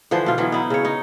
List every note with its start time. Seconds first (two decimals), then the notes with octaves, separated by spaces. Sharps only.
0.11 D3 E3 F3 C5
0.26 B2 F4
0.38 E3 F#3 B3
0.52 D#4 E4
0.70 C#3 C#5
0.85 D#4